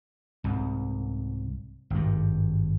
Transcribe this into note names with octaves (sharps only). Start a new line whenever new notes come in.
C2 G#2
G#1 G2